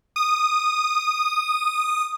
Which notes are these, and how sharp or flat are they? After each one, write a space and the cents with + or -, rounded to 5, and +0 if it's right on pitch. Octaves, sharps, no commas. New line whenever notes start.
D#6 -15